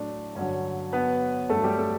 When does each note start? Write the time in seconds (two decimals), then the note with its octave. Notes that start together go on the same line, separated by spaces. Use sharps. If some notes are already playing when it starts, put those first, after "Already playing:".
Already playing: A2 F#3 A3 D4 D5
0.35 G2 D3 F#3 C#4 C#5
0.93 B3 B4
1.50 G2 F#3 A3 A4
1.64 G3 G4
1.78 A3 A4